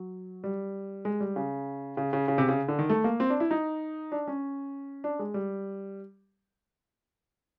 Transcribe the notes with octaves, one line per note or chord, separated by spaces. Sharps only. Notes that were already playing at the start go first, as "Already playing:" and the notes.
Already playing: F#3
G3
G#3
G3
C#3
C#3
C#3
C#3
C3
C#3
D3
D#3
A3
A#3
C4
D4
E4
D#4
D4
C#4
D4
G#3
G3